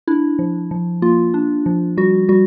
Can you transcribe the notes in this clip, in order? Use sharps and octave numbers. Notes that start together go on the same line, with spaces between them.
D4 E4
F3
F3
A#3 F4
D4
F3
G3 F#4
G3 F#4